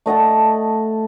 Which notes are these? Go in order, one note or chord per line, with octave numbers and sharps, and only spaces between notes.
A3 D#5 F#5 A5